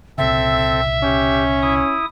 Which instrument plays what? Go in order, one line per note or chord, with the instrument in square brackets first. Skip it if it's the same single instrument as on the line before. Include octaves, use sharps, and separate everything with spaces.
[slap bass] C2 A#2 C#3 [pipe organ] C4 A4 [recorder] E5
[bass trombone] C#4 [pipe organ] G4
[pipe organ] E4 D#6